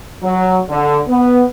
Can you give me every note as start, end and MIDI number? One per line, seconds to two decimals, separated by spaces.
0.23 0.60 54
0.70 0.99 50
1.08 1.43 59